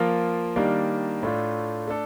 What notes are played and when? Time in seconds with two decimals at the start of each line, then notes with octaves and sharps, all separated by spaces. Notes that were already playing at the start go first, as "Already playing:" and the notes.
Already playing: F3 A#3 F4 A#4
0.56 D#3 G3 A#3 D4
1.23 A2 A3 D4 F4
1.87 A3 D4 A4